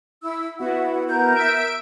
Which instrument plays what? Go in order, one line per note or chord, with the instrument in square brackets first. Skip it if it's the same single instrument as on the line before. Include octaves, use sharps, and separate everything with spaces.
[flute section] E4 E6
[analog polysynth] B3 E4 F#4 [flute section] F#5
[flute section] A#4 G6
[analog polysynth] E5 D7